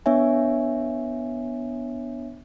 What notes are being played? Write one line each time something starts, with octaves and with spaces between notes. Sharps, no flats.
B3 D4 C#5 E5 G#5